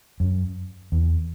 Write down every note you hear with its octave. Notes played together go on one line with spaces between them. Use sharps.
F#2
E2